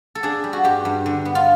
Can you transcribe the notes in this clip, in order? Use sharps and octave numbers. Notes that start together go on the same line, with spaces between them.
A4
D4 G#4
G3
F#4
G2 G4
G2
D3
B3
F4